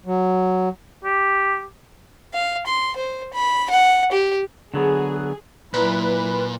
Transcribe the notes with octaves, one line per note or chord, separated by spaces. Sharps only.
F#3
G4
F5
C6
C5
B5
F#5
G4
D3 F#3 B3 G#4
A#2 F#3 E4 B4